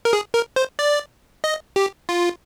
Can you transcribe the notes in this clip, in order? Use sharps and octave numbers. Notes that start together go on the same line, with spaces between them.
A#4
G#4
A#4
C5
D5
D#5
G4
F4